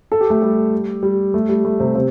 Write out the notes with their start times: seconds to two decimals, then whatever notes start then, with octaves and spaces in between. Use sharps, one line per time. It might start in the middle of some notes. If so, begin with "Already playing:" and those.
0.12 A4
0.21 G4
0.30 A3 A4
0.42 G3 G4
1.03 G3
1.34 A3
1.49 G3
1.65 A3
1.80 C3 C4
1.95 C3 C4